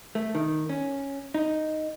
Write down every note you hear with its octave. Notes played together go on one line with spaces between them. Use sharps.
A3
D#3
C#4
D#4